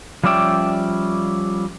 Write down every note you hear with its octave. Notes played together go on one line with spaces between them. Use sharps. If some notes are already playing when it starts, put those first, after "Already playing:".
F3 G3 C#4 D5 E5 G5